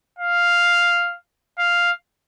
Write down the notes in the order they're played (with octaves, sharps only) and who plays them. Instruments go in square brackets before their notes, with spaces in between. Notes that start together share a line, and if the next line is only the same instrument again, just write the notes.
[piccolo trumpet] F5
F5